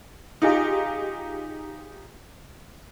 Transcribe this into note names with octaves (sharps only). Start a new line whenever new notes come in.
D#4 F4 G4 G#4 D#5